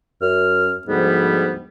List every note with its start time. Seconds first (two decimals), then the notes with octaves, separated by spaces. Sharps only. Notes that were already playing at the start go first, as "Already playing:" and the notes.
0.21 F#2 F6
0.88 D2 G#2 F3 G3 B3